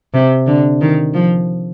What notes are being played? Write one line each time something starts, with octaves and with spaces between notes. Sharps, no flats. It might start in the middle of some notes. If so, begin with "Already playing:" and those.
C3
D3
D#3
F3